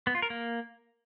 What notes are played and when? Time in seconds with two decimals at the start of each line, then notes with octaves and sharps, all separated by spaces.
0.07 B3
0.15 F4
0.22 A#4
0.30 A#3